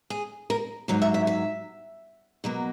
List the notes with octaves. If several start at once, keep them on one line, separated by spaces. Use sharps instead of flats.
G#4
A#4
G#2 F#3 A#3 C#5
E5
E5
E5
B2 F#3 A#3